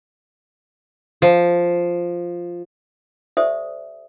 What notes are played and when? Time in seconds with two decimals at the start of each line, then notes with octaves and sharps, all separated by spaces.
1.22 F3
3.37 G4 A4 C5 D5 E5 D#6